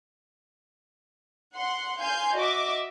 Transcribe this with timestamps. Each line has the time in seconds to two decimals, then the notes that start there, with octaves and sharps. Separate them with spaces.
1.54 F#5 C6
2.01 F5 G#5 C6 G6
2.36 F#4 D#5 E5 D6